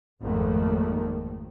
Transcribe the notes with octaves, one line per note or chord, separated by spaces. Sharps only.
G#1 F2 D#3 A3 A#3